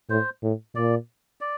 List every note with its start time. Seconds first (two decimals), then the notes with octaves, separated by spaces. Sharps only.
0.09 A2 C5
0.43 A2
0.76 A#2 D5
1.41 D5